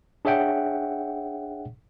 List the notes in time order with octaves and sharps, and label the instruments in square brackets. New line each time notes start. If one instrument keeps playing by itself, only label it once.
[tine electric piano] D4 G#4 C#5 E5 F#5 G5